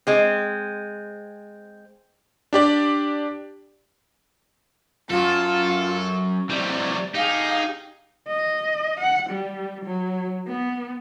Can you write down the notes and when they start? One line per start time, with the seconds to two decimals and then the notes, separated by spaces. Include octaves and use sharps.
0.07 G#3 C4
2.53 D4 G4 D5
5.10 F#2 F#3 F4 A4
6.50 C3 E3 F#3 G3 D5
7.15 D#4 G4 G#4 F5
8.28 D#5
9.00 F#5
9.30 G3
9.85 F#3
10.47 B3